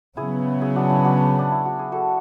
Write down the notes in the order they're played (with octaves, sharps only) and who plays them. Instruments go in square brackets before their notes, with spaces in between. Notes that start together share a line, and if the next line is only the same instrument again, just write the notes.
[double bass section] C#3 F#3 B3 [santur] E4 G#4
[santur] E4 G#4
D4 F#4
E4
D4 F#4
D4
E4
F#4
G#4
F#4 A4